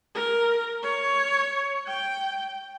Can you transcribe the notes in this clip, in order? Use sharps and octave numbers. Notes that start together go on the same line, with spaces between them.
A#4
C#5
G5